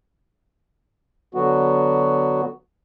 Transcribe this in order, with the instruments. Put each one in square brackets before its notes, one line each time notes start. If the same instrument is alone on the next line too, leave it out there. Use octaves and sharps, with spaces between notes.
[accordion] D3 F#3 B3 F#4